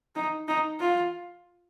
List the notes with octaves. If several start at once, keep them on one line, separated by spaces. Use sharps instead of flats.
D#4
D#4
F4